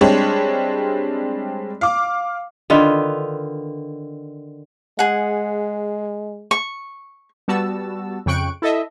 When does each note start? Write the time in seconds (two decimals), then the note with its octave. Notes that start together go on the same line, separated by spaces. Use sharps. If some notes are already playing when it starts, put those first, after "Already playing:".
0.01 G3 G#3 C4 D4 C#5
1.81 F5 D6
2.70 D3 D#3 F4 B4
4.99 G#3 G#4 F#5
6.51 C#6
7.48 G3 B3 F#4 A5 E6
8.26 F2 C#3 G5 C#6 F#6 D7
8.62 E4 A4 D#5 E5